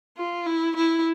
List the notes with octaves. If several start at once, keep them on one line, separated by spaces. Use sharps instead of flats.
F4
E4
E4